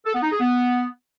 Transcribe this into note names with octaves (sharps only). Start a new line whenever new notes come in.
A4
B3
D#4
G#4
B3